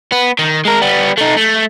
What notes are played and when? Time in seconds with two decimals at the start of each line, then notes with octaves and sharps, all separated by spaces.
0.12 B3
0.39 D#3
0.65 G#3 A#4
0.81 G3 B3
1.18 A3 D#4
1.37 A3